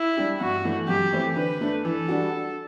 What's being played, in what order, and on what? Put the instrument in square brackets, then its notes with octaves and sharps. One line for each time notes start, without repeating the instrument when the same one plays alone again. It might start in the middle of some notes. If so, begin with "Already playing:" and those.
Already playing: [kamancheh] E4
[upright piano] G3 D4 G4
[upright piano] G2 [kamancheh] F#4
[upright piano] E3 A3
[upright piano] F#2 [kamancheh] G4
[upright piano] E3 A3 C4 E4
[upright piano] D3 [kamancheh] B4
[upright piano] A3 D4
[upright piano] E3 [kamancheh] A4
[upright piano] G3 D4 F#4